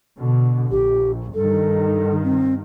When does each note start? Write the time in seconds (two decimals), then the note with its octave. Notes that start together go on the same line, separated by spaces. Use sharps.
0.19 B2 D3
0.71 A#1 G4
1.34 G2 D#3 A4
2.23 C4